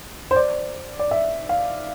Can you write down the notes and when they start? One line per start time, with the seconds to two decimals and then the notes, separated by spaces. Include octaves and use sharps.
0.31 C5
0.36 D5
0.99 D5
1.11 E5
1.49 F5